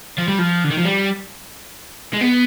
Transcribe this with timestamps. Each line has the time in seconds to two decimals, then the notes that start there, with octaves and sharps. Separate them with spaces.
0.18 F3
0.28 G3
0.39 F3
0.64 D3
0.71 D#3
0.78 F3
0.85 G3
2.13 G#3
2.21 B3